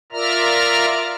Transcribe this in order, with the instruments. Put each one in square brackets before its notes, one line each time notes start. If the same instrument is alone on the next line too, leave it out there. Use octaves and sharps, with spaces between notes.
[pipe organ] F4 A#4 D5 E5 A#5 F6